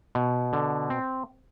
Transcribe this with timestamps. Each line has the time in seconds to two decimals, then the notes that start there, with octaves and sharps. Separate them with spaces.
0.15 B2
0.53 D3
0.90 C4